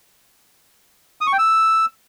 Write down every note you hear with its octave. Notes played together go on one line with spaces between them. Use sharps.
D#6
C#6
G5
E6